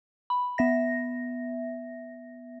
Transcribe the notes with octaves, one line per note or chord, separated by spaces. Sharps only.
B5
B3 E5 A#6